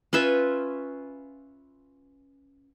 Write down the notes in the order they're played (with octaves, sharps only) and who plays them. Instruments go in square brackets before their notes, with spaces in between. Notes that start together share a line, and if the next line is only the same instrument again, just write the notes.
[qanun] C#4 F4 B4 E5